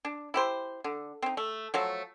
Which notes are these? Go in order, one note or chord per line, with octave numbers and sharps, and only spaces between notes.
D4
E4 G4 C5
D3
C4 D#4
A3
F3 F#3 A3